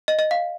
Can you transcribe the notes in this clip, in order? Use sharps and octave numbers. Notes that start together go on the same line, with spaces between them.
D#5
D#5
F5